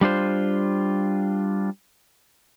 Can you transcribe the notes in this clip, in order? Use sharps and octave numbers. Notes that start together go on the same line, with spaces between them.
G3 D4 F4 C5